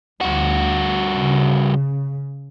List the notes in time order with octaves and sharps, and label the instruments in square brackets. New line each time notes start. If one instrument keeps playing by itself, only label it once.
[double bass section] D2 [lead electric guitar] G2 F#4
[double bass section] C#3